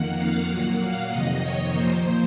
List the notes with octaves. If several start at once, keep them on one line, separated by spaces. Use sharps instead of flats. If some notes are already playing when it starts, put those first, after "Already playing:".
Already playing: F2 D#3 A#3 F#5
F5
A#2 F#3 A#3 F#5
F5
F2 C3 D#3 D#5
C#5
A#2 F3 A#3 C5